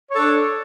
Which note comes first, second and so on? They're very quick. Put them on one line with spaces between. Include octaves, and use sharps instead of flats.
C#5 A4 D4